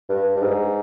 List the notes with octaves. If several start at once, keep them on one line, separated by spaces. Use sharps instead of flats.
G2
G2
G#2